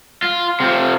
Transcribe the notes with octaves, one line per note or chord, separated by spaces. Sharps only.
F4
C3 F3